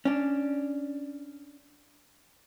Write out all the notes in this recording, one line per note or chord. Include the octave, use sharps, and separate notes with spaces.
C#4 D4